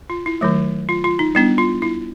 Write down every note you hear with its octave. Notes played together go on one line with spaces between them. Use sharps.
F4
E4
D#3 F#3 A3
F4
F4
D#4
G3 B3 D4 E4
F4
E4